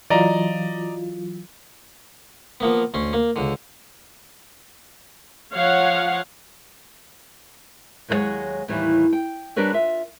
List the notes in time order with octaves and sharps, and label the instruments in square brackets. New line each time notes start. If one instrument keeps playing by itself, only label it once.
[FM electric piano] E3 F#3 F4 [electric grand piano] D5 D#5 A#5
[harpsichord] F3 A#3 B3
D2 C#4 C6
A#3
C#2 D3
[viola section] F3 C#5 F5 F#5
[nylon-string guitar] D#2 F#3 G#3 A#4 C#5 F#5
D#2 A2 D#3 E3 G3
G5
G3 D4 G4 A#4 B4 C#5
F4 E5